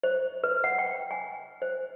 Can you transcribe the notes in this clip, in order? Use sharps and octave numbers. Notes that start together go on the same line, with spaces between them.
C5
B4
F#5
G5
G#5
C5